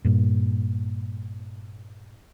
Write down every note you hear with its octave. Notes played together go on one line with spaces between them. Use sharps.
G2 A#2